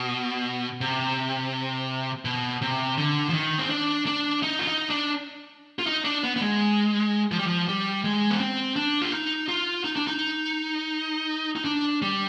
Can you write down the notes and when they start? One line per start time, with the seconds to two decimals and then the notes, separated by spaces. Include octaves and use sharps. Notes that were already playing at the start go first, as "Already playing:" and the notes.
Already playing: B2
0.81 C3
2.25 B2
2.62 C3
2.98 D3
3.29 F3
3.33 D#3
3.58 C4
3.70 D4
4.06 D4
4.43 D#4
4.59 F4
4.67 D#4
4.90 D4
5.79 F4
5.86 D#4
6.04 D4
6.23 B3
6.36 B3
6.41 G#3
7.31 F3
7.39 G3
7.46 F3
7.68 G3
8.04 G#3
8.30 B3
8.40 C4
8.76 D4
9.02 F4
9.12 D#4
9.48 F4
9.84 D#4
9.96 D4
10.07 D#4
11.56 D#4
11.65 D4
12.02 G3